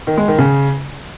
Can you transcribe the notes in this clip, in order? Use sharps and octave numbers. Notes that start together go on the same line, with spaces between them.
D#3
G#3
D#3
C#3